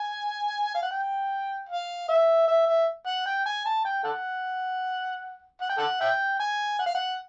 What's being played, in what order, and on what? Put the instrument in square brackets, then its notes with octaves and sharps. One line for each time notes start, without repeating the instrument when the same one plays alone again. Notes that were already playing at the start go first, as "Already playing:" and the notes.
Already playing: [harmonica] G#5
F5
F#5
G5
F5
E5
E5
E5
F#5
G5
G#5
A5
G5
A4 F#5
F#5
G5
A4 F#5
E5 G5
G#5
F#5
F5
F#5